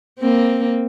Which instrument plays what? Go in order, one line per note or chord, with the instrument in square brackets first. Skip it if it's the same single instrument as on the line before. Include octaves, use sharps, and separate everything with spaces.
[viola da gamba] A#3 C4